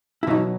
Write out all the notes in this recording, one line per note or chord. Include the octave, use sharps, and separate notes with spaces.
E4
B2 D#3 F#3 D#4